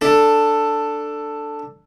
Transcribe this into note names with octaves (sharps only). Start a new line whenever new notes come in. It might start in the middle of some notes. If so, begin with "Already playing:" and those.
D4 A4